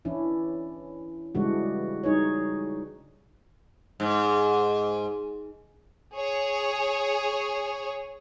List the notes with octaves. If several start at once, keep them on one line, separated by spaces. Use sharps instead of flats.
E3 C#4 D4 E4
C#3 E3 G3 G#3 D4 F#4
G3 D#4 G#4 C#5
G#2
G#4 C#5